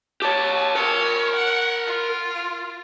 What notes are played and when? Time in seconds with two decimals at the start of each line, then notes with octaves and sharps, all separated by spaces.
0.22 G4 C#5 A5
0.75 A#4 C#5 A5
1.35 F#5
1.87 F4